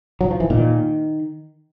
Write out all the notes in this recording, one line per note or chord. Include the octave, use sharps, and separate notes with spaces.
F#3
F3
E3
A#2 D#3